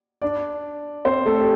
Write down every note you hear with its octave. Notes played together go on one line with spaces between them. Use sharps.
D4 D5
C4 C5
A3 A4
G4